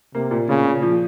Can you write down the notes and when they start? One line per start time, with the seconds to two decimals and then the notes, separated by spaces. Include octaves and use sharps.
0.15 C3 A#3
0.31 A#2
0.49 A#2 C#3
0.65 A#2
0.82 F3